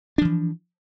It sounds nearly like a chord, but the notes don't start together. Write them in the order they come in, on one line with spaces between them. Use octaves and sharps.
D4 F3 E3